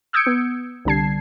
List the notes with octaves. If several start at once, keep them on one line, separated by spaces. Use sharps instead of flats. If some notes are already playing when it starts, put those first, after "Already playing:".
D#6 E6 G6 G#6 C#7 D7
B3
C2 D3 G3 A5 G#6 C7